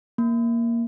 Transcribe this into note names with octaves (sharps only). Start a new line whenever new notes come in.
A#3